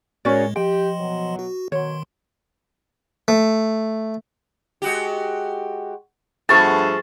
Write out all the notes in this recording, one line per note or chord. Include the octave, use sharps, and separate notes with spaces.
A2 G#3 C#4 F#4 G#4 A#4 C#5 D5
F3 G4 D#5 G5 C6
B2 F#3
F#4
B2 D#3 F#3 C#5 C6
A3
G#3 F#4 G4
G2 F3 A3 B3 G#4 A5 C#6